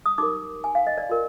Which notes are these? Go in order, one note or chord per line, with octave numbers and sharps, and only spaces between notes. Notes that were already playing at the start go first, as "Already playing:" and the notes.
D#6
D#4 G4 A#4 D6
G#5
F5
D#5
D5
F4 A#4